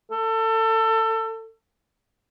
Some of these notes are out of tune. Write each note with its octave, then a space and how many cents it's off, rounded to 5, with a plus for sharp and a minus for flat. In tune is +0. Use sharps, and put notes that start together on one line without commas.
A4 +25